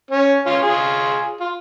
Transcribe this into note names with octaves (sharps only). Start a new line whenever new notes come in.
C#4
C#4 F4
F4 G#4
F4